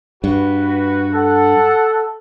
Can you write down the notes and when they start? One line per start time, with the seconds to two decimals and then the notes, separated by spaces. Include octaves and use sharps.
0.24 G2 F#4 B4
1.15 A4 F#5